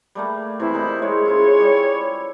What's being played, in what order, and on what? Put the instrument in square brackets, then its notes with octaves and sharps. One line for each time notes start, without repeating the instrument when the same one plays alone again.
[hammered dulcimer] G3 A3 A#3
[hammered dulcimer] C3 E3 [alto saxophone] E4
[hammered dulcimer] A#2 D#4 B5
[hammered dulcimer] G#3 [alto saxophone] C#5
[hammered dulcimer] C#3 E4 F4
G3